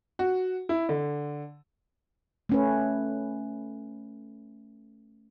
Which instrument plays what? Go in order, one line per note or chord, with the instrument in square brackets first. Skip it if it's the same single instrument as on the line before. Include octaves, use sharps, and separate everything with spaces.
[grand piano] F#4
E4
D3
[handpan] A3 C#4 B4